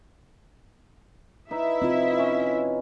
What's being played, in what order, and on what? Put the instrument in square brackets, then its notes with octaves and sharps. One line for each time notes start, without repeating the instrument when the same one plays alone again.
[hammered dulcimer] D#4 B4 B5 [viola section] E4 E5
[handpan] C4 F4 [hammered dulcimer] B4 D#5
[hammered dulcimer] C#4 B4